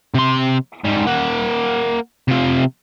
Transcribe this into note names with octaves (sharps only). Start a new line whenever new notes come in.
C3 C6
G#2 G3
A#3 F#5
C3 F4